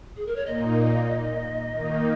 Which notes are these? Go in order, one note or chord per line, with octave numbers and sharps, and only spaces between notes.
G#4
A#4
C#5
A#2 A#3 D#4 D#5
D#3 A#3 D#4